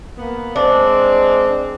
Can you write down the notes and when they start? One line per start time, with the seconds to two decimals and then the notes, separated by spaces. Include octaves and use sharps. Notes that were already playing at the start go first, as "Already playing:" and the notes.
0.17 A#3 B3
0.56 G#3 C4 D4